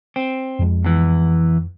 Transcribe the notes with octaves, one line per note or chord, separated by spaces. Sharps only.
C4
F2 F3 G#3
E2 E3